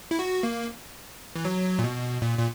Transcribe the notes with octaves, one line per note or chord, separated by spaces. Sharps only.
E4
F#4
A#3
E3
F#3
A#2
B2
A#2
A#2